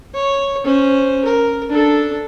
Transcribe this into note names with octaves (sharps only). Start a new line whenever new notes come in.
C#5
C#4 C5
A#4
D4 A4